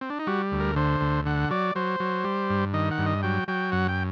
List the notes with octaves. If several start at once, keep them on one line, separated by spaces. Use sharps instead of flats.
C4
D4
D#4
G3 F#4
D2
A#4
D3 C5
D2
D3 F#5
F#3 D5
F#3 C5
F#3
G3
G2
D#3 D#5
F#5
G2
D#5
F#3 G5
F#3 G5
F#2 F#5
G5